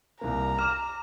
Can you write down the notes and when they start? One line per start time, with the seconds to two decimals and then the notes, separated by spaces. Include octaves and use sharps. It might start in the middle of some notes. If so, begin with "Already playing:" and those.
0.21 C2 A#3 A#5
0.59 D6 F6 E7